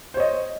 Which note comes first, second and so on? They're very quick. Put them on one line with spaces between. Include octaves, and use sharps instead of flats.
C5 C#5 D#5